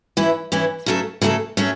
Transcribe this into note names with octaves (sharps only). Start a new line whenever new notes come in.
E3 C#4 E4
E3 C#4 E4
C#3 F#3 A3 F#4 A4
C#3 F#3 A3 F#4 A4
F#3 A3 C#4